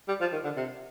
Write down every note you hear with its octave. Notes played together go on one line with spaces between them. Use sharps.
G3
F3
D#3
D3
C3